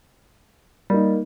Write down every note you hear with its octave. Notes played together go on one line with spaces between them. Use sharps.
G3 A#3 D#4